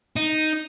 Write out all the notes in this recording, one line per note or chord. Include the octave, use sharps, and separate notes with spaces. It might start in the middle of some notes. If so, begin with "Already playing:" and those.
D#4